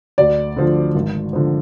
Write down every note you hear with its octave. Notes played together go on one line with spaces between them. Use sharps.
D2 D5
D3 F3
G#1
D3 F3